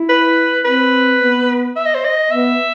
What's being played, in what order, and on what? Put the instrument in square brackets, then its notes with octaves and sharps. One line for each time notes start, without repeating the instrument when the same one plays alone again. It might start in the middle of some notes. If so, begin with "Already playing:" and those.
Already playing: [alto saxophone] E4
[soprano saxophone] B4
[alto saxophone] C4 [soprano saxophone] B4
[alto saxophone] B3
[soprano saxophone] E5
D#5
C5
D#5
[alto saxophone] B3 [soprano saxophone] E5